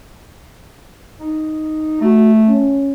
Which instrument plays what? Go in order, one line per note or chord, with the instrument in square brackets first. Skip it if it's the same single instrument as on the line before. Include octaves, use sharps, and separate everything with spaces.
[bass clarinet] D#4
[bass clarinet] A3 [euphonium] F#4
[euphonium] C#4